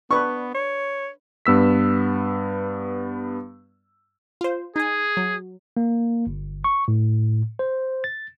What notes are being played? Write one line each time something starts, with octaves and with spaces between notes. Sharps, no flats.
B3 D4 B4 C#6
C#5
G2 B3 E6 B6
F4 C5
D#4 G#4 G#5
F#3
A#3
G1
C#6
A2
C5
A6